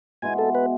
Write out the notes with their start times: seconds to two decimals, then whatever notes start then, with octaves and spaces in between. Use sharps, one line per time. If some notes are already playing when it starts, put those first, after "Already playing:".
0.22 B2 G#3 B3 E4 G#5
0.38 A4
0.55 B4